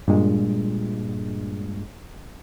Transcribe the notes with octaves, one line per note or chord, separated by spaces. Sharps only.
G2 A#2 G#3